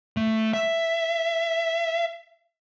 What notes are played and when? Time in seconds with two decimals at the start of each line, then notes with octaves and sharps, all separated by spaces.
0.17 A3
0.53 E5